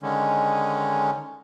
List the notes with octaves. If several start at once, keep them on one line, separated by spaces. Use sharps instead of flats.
D3 D#3 G#3 C#4